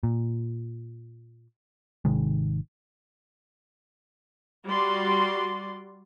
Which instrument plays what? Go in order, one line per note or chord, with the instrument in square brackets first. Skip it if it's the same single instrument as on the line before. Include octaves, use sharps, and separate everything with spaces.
[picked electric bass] A#2
G#1 C3 D#3 G#3
[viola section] G3 F#4 D5 C6